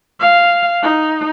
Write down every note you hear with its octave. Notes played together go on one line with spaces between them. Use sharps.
F5
D#4